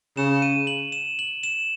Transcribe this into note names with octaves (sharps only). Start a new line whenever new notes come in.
C#3 E7
D#7
F#7
E7
F#7
E7